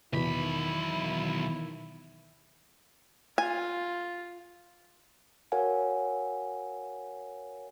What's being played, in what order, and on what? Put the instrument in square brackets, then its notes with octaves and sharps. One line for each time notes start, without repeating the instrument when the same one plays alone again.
[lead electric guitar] B1 B5 [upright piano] E2 B2 [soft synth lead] D#3 [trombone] E4
[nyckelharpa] F4 [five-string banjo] G#5
[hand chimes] F#4 A#4 C#5 F5 F#5 G#5